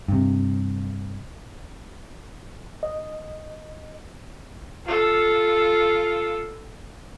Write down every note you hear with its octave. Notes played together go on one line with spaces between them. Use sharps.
G2 C3
D#5
F4 A4